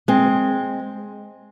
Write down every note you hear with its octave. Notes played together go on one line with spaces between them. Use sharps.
G#3 C4